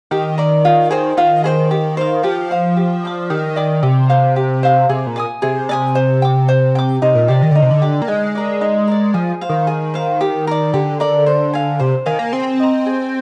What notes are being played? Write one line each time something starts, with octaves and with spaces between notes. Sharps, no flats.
D#3 G4
A#4 D5
F4
G#4 C5 G5
D#3 F4
G#4 C5 G5
G4
C5 F5
F3 G4
C5 F5
G4
D5 G5 D6
D#3 G4
D5 G5 D6
C3 G4
C5 F5
G4
C5 F5
C3 G#4
A#2
D5 G#5 D#6
C3 G#4
D5 G#5 D#6
C5
G5 D6
C5
G5 D6
C3 D#4
A#2
C3 G4 D5
D#3
D3 D#4
C3
D3
G4 D5
A#3
G#3 D#4
A#4 D5
D#4
A#4 D5
F3 G#4
C5 F5
D#3
G#4
C5 F5
G4
A#4 D5
D3 G4
A#4 D5
C5
F5 G#5
C3 C5
D#3 F5 G#5
A#3
C4 G#4
D#5 A#5
G#4